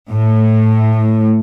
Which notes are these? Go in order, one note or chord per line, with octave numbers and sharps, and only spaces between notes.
A2